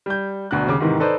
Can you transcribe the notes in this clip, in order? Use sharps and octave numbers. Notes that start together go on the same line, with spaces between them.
G3 G6
E1 D2 B2 D4 F#6
D#2 C#3 D6
G#2 C3 D#3 E3
D#4 A4 B4 C5 D5